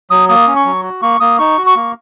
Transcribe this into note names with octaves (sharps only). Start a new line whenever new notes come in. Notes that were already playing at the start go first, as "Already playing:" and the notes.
F#3 D#6
A#3 D#6
C#4
C#6
F#3
F#4
A#3 C#6
A#3 D#6
D#4 C#6
F#4
C#6
A#3